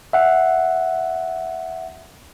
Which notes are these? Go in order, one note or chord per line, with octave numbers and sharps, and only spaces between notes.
E5 F#5